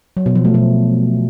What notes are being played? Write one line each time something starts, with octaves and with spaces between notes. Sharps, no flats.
F#3
B2
F3
A3
B2